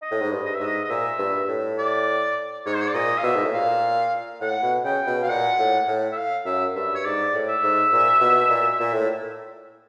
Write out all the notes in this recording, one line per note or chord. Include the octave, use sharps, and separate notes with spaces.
D#5
A2
G#2
G2
D#5
E5
G#2 D#5
D#5
A#2 E5
G2
A2
D5
G#2 C#5
C5
C#5
D5
A#2 D#5
F5
B2 E5
G#2
A2
A#2 F5
A2 F#5
B2
C#3 G5
B2
B2 F5
A#2 F#5
A2
A2
E5
F5
F#2 E5
G2 E5
C#5
G#2 D5
A2
E5
G#2
A#2
B2
A#2
A#2
A2